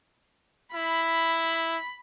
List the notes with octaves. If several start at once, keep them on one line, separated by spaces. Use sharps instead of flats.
E4 B5